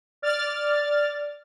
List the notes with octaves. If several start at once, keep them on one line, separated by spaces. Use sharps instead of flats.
D5 F6 A6